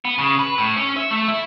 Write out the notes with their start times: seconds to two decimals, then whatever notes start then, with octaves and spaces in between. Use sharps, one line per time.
0.05 B3
0.19 C#3
0.39 B4
0.58 A2
0.77 C#4
0.97 E5
1.11 A3
1.28 E4